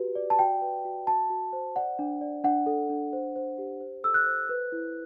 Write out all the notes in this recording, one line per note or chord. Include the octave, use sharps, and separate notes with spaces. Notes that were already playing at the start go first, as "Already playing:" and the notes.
Already playing: F#4 G4 B4
D5
A5
F#4 G5
B4
F#4
F#4 A5
F#4
C5
D5 F#5
D4
D5
D4 F#5
A4
D4
C5
C5
G4
C5
A4 E6
F#6
C5
B4
E4